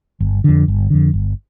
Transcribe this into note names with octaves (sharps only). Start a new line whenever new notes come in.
G1
F2 D3
G1
F2 D3
G1